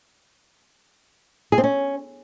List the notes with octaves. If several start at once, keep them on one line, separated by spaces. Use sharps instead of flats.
G#4
C4
C#4